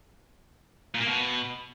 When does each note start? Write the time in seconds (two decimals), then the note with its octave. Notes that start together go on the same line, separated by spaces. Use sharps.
0.94 A#2
1.01 A#3
1.07 B2